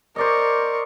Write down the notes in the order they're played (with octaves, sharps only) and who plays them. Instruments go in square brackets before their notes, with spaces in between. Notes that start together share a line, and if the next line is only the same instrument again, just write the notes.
[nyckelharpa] A#4 C#6 [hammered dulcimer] C5 D5 D#5